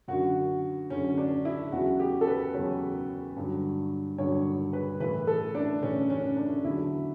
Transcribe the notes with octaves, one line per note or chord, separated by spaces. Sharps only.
F#2 D3 F#3 F#4
F#2 D3 F#3 C#4
D4
E4
E2 C#3 F#3 F#4
G4
A4
B4
E2 C#3 F#3 C#5
G2 D3 F#3
G2 D3 F#3 C#5
B4
A2 E3 B4
A4
D4
A2 E3 C#4
C#4
D4
E2 D3 F#3 E4